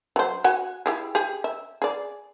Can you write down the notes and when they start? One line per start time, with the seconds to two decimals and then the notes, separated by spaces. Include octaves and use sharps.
0.16 F#3 C5
0.44 F#4 F#5 G#5
0.86 E4 G4 G#4
1.15 G4 G#4
1.44 E5
1.82 G#4 D5